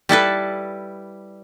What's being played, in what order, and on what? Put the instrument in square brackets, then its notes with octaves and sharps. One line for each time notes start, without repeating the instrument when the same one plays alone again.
[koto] G3 E4 A4 B4